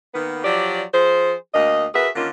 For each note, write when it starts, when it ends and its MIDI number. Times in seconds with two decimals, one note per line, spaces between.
0.14 0.42 51
0.14 0.42 58
0.14 0.42 59
0.44 0.82 53
0.44 0.82 54
0.44 0.82 67
0.44 0.82 74
0.93 1.33 53
0.93 1.33 68
0.93 1.33 72
1.54 1.86 38
1.54 1.86 58
1.54 1.86 75
1.94 2.08 66
1.94 2.08 68
1.94 2.08 70
1.94 2.08 71
1.94 2.08 76
2.16 2.28 50
2.16 2.28 51
2.16 2.28 58
2.16 2.28 61
2.16 2.28 65